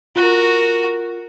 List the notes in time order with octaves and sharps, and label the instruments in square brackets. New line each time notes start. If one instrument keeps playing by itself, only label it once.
[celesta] F4 F#6 [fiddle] F#4 A#4